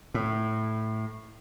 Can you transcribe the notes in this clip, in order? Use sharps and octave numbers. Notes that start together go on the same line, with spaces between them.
A2